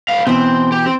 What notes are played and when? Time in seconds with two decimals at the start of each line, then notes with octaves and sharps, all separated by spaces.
0.08 B3 F5
0.27 B2 E3 C4
0.72 G4
0.86 C4